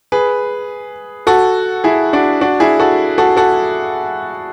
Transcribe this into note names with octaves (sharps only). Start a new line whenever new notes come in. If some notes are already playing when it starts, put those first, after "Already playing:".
G#4 B4
F#4 A4
E4 G#4
D4 F#4
D4 F#4
E4 G#4
F#4 A4
F#4 A4
F#4 A4